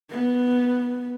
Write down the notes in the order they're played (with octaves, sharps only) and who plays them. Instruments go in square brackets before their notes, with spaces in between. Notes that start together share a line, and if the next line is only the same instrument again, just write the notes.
[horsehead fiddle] B3